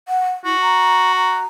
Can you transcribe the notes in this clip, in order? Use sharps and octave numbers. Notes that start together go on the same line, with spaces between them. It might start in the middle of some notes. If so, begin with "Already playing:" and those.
F#5
E4 F#4
A#5
A#5